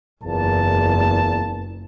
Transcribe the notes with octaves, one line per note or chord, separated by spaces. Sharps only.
F#1 E2 A#2 A5